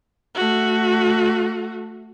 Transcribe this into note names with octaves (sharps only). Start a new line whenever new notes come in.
A3 F#4